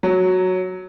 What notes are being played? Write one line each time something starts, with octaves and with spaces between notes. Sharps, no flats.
F#3